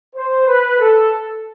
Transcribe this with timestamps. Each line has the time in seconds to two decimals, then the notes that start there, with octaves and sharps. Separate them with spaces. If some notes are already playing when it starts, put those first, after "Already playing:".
0.16 C5
0.47 B4
0.78 A4